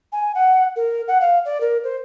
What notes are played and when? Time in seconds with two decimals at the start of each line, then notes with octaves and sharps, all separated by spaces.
0.12 G#5
0.35 F#5
0.76 A#4
1.08 F#5
1.21 F5
1.45 D5
1.61 A#4
1.84 C5